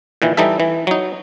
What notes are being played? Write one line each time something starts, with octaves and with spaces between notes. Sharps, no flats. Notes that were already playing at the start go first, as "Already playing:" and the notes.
A#2 D#3 E3
E3 G3 D#4 A4 E5
E3
F#3 D#4